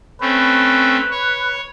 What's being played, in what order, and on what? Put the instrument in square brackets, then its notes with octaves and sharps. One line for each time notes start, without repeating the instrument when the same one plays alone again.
[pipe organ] A3 C4 C#4 [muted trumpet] B4
[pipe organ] C#5